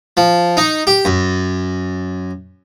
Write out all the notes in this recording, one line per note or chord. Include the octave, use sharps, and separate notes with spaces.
F3
D#4
G4
F#2